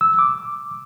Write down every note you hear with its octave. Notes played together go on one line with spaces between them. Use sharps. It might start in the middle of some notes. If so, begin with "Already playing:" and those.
E6
D6